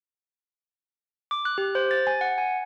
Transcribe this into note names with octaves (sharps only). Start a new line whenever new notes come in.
D6
F#6
G4
C5
A6
G#5
F#5
G#5